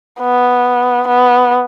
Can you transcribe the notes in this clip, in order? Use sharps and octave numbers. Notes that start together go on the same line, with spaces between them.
B3
B3